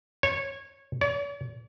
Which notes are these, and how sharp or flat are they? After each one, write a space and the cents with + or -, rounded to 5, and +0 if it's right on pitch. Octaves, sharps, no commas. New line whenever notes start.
C#5 -20
C#5 +45